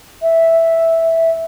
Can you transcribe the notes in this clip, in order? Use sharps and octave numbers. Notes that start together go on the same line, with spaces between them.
E5